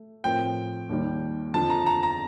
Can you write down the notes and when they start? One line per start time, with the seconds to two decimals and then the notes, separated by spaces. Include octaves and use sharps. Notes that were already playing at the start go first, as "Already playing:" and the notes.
Already playing: A3
0.24 A2 F3 C4 F4 A#4 G5
0.89 D#2 D#3 G3
1.54 F2 D3 F3 A5
1.70 A#5
1.86 A#5
2.03 A#5